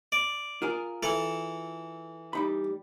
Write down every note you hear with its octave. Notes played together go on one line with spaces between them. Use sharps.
D5
F4 G#4 A#4
E3 A4
G3 D#4 B5